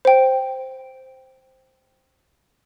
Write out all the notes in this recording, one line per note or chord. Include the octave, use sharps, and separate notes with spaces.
C5 G5